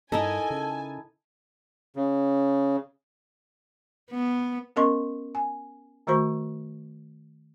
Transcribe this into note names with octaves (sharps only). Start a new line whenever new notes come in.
G2 D#4 E4 A4 A#4 G#5 A5
C#3
C#3
B3
B3 C#4 A#4 D#5 C6 C#6
G#5
D#3 A3 F#4 C5 C#6